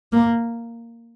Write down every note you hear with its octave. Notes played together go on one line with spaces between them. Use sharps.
A#3